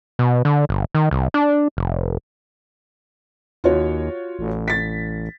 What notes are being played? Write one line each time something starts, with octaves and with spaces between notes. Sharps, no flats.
B2
D3
G1
D#3
C2
D4
F1
D#2 F4 F#4 C#5
A1
A6 B6